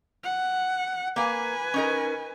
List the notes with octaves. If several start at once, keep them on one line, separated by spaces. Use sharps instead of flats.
F#5
A#3 B4 F5 G#5
C#4 D#4 A#4